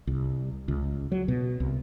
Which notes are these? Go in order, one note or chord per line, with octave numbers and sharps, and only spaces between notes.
C2
C#2
F#3
B2
C2